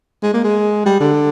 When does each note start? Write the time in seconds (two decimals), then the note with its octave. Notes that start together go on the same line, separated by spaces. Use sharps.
0.23 G#3
0.34 A#3
0.44 G#3
0.86 G3
1.00 D3